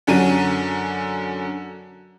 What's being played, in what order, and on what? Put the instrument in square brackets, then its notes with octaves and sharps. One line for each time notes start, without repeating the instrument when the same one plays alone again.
[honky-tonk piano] F#2 D3 C#4 F#4 D#7